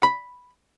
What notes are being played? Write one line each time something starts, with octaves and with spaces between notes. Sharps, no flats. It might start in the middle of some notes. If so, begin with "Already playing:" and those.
B5